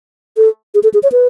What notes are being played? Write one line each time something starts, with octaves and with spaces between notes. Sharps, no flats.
A4
G#4
A4
G#4
C#5
B4